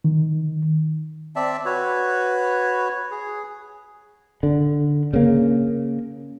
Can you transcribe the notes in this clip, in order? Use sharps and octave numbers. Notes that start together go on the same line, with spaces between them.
D#3
C4 D5 E5 A5
F#4 B4 C#5
G#4
D3
C#3 A#3